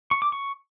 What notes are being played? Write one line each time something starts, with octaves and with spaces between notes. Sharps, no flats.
C#6
D6
C#6